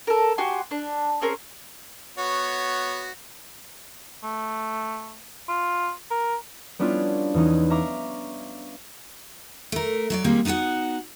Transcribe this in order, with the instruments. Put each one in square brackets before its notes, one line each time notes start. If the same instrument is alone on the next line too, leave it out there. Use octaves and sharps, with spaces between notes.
[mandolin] A4 A#4
F#4 G4 G#5 C6
D4
C4 C#4 G#4 A#4
[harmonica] B3 F#4 C#5
[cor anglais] A3
F4
A#4
[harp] G3 B3 C#4 D4 E4 F4
E2 E3 C#4 D#4
E5 F5 A#5 C#6 D6
[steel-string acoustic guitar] A3 A#4
F#3 C#5 D5
D#3 G3 G#3 A#3 C4
B3 D#4 E4 F#4 F#5